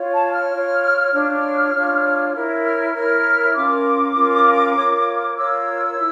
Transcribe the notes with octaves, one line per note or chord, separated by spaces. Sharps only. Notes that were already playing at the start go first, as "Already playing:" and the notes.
Already playing: F4 C#5
A5
F6
F4 C#5
D4 F4 C#5 F6
D4 F4 C#5
E4 A#4 C#5
F6
E4 A#4 C#5 F6
C#4 F4 A#4 D6
C#4 F4 A#4
F4 A#4 C#5
F4 A#4 C#5 E6
E4